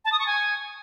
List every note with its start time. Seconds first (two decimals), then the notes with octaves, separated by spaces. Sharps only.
0.05 A5
0.12 D#6
0.19 C#6
0.26 G#5